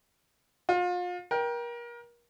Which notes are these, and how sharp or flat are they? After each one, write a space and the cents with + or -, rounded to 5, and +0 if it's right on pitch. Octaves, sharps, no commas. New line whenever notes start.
F4 +35 F5 +35
A#4 +30 G5 +0